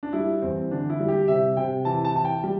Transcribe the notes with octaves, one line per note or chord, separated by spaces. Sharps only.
D4
G3 E4
E2 C4
D3 D4
E4
G3
G4
C3 E5
C3 G5
E3 A5
A5
E3 A5
G5
G3